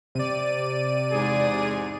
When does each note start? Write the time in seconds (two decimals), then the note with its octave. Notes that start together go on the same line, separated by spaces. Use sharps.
0.15 C3 D5 D#7
1.12 E2 G#2 G#4